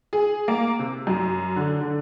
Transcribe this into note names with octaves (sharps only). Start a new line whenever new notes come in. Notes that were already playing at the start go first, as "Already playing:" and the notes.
G#4
A#3
C3
F#2
D3
D3